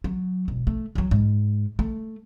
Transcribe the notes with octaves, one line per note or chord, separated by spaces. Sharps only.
F#3
E1
A3
E2 F#3
G#2
A3